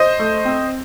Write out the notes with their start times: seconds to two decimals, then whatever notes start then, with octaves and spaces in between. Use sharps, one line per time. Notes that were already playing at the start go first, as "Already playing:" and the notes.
Already playing: C5 D#5
0.19 A3
0.45 C4